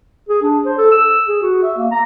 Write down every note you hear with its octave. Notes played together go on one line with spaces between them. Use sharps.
G#4
D4
C5
A4
E6
G#4
F#4
E5
A#3
A#5